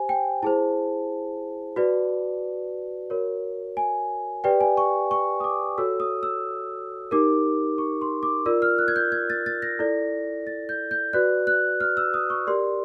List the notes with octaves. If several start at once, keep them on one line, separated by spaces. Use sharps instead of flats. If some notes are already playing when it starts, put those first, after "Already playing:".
Already playing: G4 C5 G#5
G5
E4 G#4 C5 A5
F#4 B4 D5
F#4 A#4 C#5
G#5
G4 B4 D5 G5
G#5
C#6
C#6
D#6
D6
F#4 A4 C#5 E6
D#6
E6
D#4 G4 A#4 D6
C#6
C6
D6
F4 A#4 D5 E6
F6
F#6
G#6
G6
G#6
A6
A6
A#6
E4 A4 D5
A6
G6
G6
F#4 B4 D5 F#6
F#6
F6
E6
D#6
C#6
G4 A#4 D5 C6